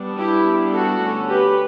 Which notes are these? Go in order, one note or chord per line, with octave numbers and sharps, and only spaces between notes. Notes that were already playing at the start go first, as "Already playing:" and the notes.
Already playing: G3 B3 D4
E4 G4
G3 B3 D4
F#4 A4
D3 A3 C#4
G4 B4